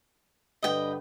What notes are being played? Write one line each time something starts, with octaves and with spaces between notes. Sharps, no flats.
G2 D3 B4 D#5 G5